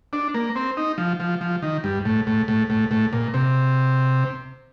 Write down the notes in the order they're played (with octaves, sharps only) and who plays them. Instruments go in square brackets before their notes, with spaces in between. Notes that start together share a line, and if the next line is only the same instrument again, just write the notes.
[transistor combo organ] D4
A#3
C4
D#4
F3
F3
F3
D#3
G2
A2
A2
A2
A2
A2
A#2
C3